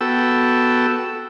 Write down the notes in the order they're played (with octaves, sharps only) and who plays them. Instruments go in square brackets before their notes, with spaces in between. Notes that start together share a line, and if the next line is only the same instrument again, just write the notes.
[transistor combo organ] B3 F#4 A4 G5 E6